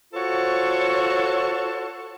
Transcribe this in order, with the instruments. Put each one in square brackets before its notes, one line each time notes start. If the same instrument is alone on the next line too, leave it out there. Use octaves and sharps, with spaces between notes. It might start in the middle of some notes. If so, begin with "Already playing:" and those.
[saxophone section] F4 F#4 A4 C5 C#5